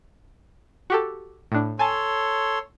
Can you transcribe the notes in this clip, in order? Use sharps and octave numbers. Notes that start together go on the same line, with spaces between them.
F#4 G4 A4
A2 D4
A4 C#5 G#5 A5 C6